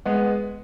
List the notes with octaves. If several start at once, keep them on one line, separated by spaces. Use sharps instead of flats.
G#3 B3